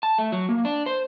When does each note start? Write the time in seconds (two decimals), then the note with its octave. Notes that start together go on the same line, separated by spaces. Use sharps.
0.03 A5
0.18 A3
0.32 F#3
0.49 A#3
0.65 D4
0.86 C5